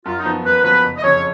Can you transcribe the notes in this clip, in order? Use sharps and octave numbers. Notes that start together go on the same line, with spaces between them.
F#2 F4
D#4
F3 B3 F#4
F#2 B4
F3 B3 F#4 B4
F#1
D#5
F2 C#3 C#5